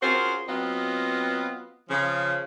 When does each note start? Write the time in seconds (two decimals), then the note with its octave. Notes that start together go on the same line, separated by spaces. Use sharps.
0.02 C#4 F4 F#4 G#4 A#4 C5
0.48 F#3 B3 C4 F4 D#5 F5
1.89 C#3 F3